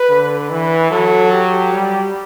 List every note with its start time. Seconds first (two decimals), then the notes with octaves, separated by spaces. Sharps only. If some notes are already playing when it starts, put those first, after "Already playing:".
Already playing: B4
0.09 D3
0.50 E3 B4
0.91 F#3 A4
1.32 G4
1.73 G3